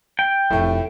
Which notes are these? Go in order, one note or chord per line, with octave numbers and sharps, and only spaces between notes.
G5
F1 A2 A3